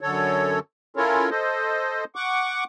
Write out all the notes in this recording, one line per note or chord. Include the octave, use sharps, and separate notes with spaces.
F#2 D3 A4 C#5
C#4 E4 F4 A4 A#4 C#5
A4 C5 D#5
F#5 C#6 D6